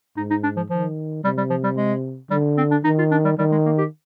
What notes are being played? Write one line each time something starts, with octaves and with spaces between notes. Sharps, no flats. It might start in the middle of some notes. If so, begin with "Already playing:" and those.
G#2 D#4
D#4
D4
F3
D#3 F3
C3 G3
G3
F3
G3
G#3
D3 G3
C4
D4
D#3 D#4
F4
D4
G3
D#3 G3
G#3
A#3
G4